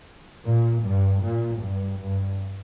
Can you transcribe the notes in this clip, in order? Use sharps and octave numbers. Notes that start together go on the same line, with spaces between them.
A#2
G2
A#2
G2
G2